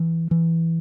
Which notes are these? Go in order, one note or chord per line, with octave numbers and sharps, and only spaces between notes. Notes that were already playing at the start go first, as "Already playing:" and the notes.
Already playing: E3
E3